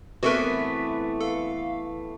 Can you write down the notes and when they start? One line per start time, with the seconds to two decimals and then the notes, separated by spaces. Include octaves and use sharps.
0.23 E3 A3 B3 C4 F#4 A4 A#4 E5
1.20 A4 F5